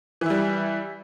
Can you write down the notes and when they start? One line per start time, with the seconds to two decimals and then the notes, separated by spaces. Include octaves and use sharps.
0.21 E3
0.26 E4
0.30 G3